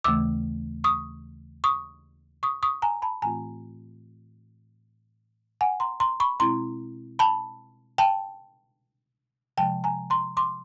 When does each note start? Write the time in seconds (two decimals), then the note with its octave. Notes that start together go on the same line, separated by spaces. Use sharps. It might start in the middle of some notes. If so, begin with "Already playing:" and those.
0.04 D#2 C#3 E3 A3 D6 E6
0.84 C#6 D#6
1.64 C#6 D#6
2.43 C#6 D#6
2.63 C#6 D#6
2.82 G#5 A#5
3.02 A5 B5
3.22 A2 E3 A3 C4 F4 G#5 A#5
5.61 F#5 G#5
5.80 A#5 C6
6.00 A#5 C6
6.20 B5 C#6
6.40 B2 G#3 C4 E4 A#5 C6
7.19 A5 B5
7.98 G5 A5
9.57 C3 F3 G#3 G5 A5
9.84 G#5 A#5
10.10 A#5 C6
10.37 C6 D6